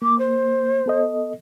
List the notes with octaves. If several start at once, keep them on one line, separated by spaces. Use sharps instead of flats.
A#3 D6
C5
B3 A4 D#5